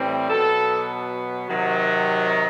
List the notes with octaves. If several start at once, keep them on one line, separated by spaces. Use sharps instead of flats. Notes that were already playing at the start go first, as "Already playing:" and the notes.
Already playing: A2 E3 G3 C4
B2 F#3 B3 A4
C3 D#3 F#3